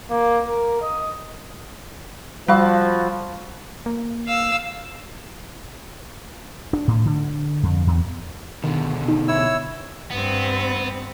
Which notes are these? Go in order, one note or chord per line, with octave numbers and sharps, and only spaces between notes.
A#3
A#4
D#5
F3 G3 F#4 F5 B5 E6
A#3
F5 E6
D4
A2
D3
F2
E2
B2 D3 D#3
D#4
E4 C#5 E6
G2 B3 C4